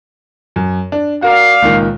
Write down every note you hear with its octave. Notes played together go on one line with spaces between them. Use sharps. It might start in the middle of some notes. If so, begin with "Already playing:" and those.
F#2
D4
F#4 A#4 D5 F5
C#2 A#2 D#3